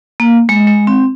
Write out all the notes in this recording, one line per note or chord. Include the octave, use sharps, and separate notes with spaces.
A#3
G#3
G#3
C4